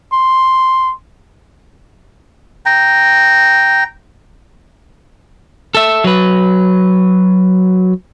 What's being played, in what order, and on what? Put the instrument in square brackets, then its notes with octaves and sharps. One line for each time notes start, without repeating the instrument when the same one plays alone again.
[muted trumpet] C6
[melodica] G5 A#5
[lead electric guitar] A4 E5
F#3 B4